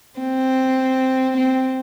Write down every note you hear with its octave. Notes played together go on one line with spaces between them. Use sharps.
C4
C4